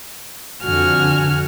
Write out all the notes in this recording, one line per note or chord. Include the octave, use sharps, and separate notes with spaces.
F2 D3 F#4 G#5 F6